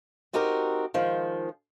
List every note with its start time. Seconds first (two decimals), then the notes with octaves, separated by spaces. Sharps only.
0.33 C4 D#4 F#4 G4 A#4
0.94 D#3 F3 G#3